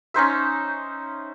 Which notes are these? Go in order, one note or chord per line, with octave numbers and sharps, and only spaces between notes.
C#4 D#4 C5 E5